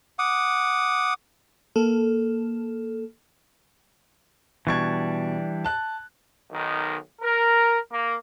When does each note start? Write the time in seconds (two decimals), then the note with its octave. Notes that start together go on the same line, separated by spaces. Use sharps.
0.19 F#5 D6 D#6
1.76 A#3 A4
4.67 B2 E3 G3 D4 C#6 G#6
5.64 A5 F#6
6.51 B1 D#3
7.21 A#4
7.91 A#3